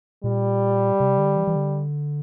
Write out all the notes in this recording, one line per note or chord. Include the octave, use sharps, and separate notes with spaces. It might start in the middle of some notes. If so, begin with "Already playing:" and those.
A#2 G3
C3
D3
E3
E3
D3